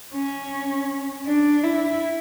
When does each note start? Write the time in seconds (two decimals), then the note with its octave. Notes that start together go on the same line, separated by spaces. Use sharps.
0.14 C#4
1.27 D4
1.63 E4